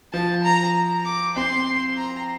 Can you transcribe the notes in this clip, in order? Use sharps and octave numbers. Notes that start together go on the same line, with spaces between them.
F3 A5
A#5
D6
C4 C6
A#5